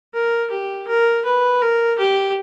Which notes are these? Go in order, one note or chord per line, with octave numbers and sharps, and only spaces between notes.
A#4
G4
A#4
B4
A#4
G4